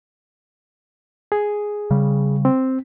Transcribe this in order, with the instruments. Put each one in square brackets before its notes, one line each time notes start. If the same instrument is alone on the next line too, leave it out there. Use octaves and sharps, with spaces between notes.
[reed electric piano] G#4
[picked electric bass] C#3 G3
[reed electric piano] C4